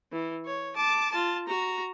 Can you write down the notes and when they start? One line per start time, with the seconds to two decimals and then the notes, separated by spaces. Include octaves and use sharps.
0.12 E3
0.46 C#5
0.76 A5 D6
1.12 F4 A5
1.48 F#4 A#5